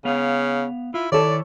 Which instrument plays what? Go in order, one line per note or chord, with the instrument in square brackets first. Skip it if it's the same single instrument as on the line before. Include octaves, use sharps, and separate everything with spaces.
[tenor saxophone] C#3 [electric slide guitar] B3 F5
[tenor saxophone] E4 [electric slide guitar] F4
[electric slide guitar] D#3 E4 [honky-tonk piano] A4 C#5 [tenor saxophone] D5